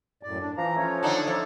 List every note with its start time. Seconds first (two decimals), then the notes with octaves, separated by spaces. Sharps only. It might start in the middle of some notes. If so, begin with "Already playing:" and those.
0.23 F#2 A2 D5
0.41 D4
0.57 E3 F3 A#5
0.76 F3 A3 C#4 C#5
1.03 D3 D4 D#4
1.27 F3 A4 C#5 D5